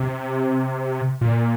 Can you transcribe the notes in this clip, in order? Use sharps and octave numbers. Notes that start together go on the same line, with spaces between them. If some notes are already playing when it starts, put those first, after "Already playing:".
Already playing: C3
A#2